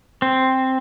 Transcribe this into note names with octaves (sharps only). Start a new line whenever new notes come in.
C4